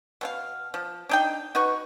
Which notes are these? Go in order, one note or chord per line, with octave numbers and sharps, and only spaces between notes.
B2 C4 F5
F3
D4 D#4 G5
D#4 F#4 B4 C#6